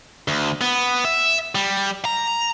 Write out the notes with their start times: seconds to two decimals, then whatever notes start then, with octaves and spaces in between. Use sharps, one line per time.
0.28 D2
0.61 B3
1.05 E5
1.55 G3
2.05 A#5